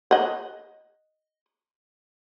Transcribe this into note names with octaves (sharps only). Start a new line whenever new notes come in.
D#5 F#5